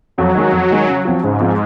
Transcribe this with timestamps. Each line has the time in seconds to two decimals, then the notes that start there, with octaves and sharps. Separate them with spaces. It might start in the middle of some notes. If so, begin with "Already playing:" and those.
0.18 F2 F#3
0.35 D#3 G#3 D#4
0.52 F2
0.70 D#3 G#3 D#4
0.87 C#3
1.05 F3 C4 F4
1.23 G#2 C#3
1.40 F3 C4 F4